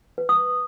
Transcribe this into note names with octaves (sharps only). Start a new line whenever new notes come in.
B4
D#6